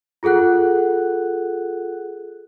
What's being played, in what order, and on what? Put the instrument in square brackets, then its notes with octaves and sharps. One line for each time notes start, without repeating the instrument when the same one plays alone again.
[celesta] F4 G#4 A4 F#5 F#6